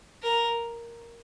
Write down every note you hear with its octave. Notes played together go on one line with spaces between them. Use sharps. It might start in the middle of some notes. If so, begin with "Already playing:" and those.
A#4